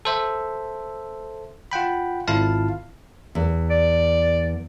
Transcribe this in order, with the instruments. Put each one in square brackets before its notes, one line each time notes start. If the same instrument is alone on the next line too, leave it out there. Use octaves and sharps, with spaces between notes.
[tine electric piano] A4 C5 E5
F4 F#5 G5 B5
G#1 E4 F4 F5 A5
[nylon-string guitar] E2
[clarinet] D5